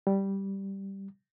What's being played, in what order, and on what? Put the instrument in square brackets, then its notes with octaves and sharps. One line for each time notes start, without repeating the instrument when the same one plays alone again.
[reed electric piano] G3